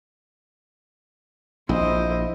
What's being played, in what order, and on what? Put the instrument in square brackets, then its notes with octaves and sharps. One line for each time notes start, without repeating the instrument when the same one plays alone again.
[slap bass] A#1 [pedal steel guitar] E4 [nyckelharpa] C5 D#5